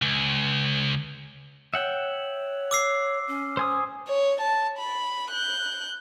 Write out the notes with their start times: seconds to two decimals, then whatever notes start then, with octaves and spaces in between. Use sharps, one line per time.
0.02 C#2
1.74 C#5 E5 F#5 G5
2.71 D6 E6 C7
3.28 C#4
3.57 C5 G#5 D#6
4.08 C#5
4.41 A5
4.78 B5
5.31 F#6 G6